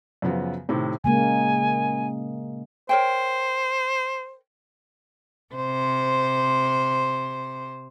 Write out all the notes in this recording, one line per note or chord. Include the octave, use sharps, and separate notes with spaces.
F#2 C#3 F3 B3
A2 C3 D#3
C#3 G#3 A#3 G#5
A#4 C5 C#5 G5
C3 C5